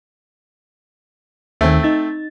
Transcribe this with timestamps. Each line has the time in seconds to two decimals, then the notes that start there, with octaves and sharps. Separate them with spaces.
1.61 D#2 D#3 A3 C4
1.83 D#4 A6